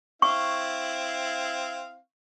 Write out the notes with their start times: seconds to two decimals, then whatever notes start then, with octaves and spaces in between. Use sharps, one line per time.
0.22 C4 E4 F5 C#6